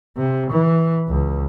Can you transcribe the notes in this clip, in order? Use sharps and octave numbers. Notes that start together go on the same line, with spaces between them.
C3
E3
C#2